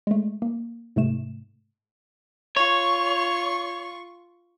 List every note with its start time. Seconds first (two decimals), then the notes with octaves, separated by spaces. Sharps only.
0.07 G#3 A3
0.42 A#3
0.96 G#2 C3 A3 E7
2.57 F4 C#5 C#6